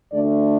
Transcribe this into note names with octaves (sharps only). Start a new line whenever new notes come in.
D2 D3 A3 D4 D5